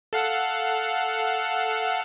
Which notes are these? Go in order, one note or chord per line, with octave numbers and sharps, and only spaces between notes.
A4 F5 F#5